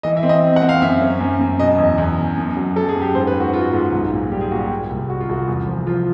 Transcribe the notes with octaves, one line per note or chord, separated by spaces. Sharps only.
E3 D#5
E5
C4
D#5
C4
F#5
C4
F5
F#2 E5
C#4
F#2
F#2
B2 D#5
E2
E2
B2
F#2
F#3
F#3 A4
G#4
F#2
G4
G#2 C5
B4
G#2
F#4
G#3 F4
F#4
F4
G#2
F#4
B1
A#2
G3 G4
G#4
A#2 F#4
G4
A#2
C2
G#3 F#4
F4
C2 F#4
E2
F3
F3 F4